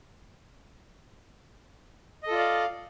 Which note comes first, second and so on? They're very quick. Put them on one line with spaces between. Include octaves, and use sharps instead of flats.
D#5 A4 F4 D5 F5